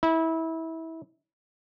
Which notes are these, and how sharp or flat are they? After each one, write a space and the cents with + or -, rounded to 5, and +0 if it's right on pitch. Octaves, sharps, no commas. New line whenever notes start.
E4 -25